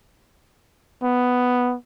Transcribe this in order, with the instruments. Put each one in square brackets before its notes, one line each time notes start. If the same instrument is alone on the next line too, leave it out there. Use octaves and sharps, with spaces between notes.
[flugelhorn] B3